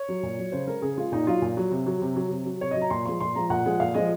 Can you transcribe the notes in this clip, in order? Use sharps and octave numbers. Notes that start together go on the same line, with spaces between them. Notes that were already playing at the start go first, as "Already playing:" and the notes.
Already playing: C#5
F#3
A#2
F#3
C#3 C5
G#3 A#4
C#3 G#4
G#3 F4
A#2 D#4
F#3 F4
A#2
F#3
C3
F#3
C3
F#3
C3
F#3
C3 C#5
F#3 D#5
A#5
A#2 C6
F3 G#3 C6
A#2 C6
F3 G#3 A#5
A#2 F#5
F3 G#3
A#2 F5
F3 G#3 D#5